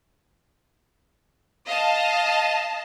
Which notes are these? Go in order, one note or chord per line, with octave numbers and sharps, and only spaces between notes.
D#5 F5 A5